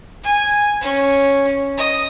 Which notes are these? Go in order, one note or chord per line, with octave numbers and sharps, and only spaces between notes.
G#5
C#4
D#5